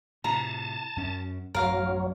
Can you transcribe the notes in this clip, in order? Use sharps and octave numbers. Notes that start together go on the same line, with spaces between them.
A2 C3 A5 A#5
F#2 C#4
A1 F#2 F#3 A#4 F5